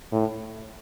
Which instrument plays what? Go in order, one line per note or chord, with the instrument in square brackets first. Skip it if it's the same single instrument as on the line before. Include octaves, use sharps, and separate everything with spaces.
[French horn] A2